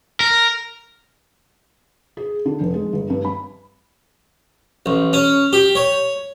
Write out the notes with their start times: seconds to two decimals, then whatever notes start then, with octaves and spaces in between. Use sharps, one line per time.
0.20 A#4
2.17 G#4
2.46 D3
2.60 F1
2.74 G#3
2.93 G1
3.10 G2
3.25 B5
4.86 A1
5.13 C#4
5.53 G4
5.75 C#5